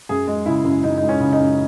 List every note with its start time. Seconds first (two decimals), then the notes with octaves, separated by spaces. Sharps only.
0.09 F#2 G#4
0.28 G#3
0.46 C#3 E4
0.64 F#2
0.84 F#2 D#4
0.98 D#4
1.03 G#3
1.09 C#4
1.20 C#3
1.33 D#4
1.39 F#2